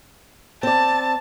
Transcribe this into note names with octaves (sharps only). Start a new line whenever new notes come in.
C4 D5 A5